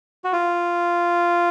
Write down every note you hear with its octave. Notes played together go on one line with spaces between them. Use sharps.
F#4
F4